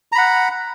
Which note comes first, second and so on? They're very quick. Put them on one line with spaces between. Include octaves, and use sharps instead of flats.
A#5 B5 F#5